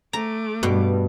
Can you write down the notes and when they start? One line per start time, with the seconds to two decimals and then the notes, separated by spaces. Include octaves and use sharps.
0.13 A3 A#5 D6
0.63 G2 B2